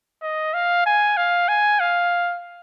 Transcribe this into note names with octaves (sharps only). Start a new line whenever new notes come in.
D#5
F5
G#5
F5
G#5
F5